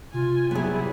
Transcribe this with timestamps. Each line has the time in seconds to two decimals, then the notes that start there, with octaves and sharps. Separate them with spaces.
0.14 C3 F4 G#5
0.51 F#3 G3 B3 E4 G#4